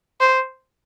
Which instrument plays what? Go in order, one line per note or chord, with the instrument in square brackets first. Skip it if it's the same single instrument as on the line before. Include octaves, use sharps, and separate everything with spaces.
[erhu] C5